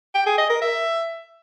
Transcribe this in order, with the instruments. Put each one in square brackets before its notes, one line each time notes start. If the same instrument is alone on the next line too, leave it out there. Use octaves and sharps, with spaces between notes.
[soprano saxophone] G5
G#4
D#5
A#4
E5